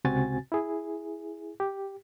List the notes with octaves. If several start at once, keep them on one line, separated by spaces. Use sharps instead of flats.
C#2 C3 C4 F#4 G#5 A6
E4 G#4
G4